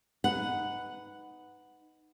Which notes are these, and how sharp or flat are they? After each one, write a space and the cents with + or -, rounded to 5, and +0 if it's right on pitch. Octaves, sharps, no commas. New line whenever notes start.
D#4 +0 B4 +15 F#5 +0